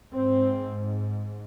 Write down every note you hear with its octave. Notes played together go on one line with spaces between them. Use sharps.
G#2 C4